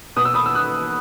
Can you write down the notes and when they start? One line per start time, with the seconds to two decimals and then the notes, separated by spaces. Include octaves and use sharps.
0.16 B2 D#6
0.25 E6
0.34 B5 D#6
0.46 E6
0.55 D#6 F#6